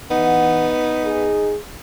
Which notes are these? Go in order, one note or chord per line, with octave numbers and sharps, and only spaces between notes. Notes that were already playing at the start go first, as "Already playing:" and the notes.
E3 B3 D#4 F#5
G#4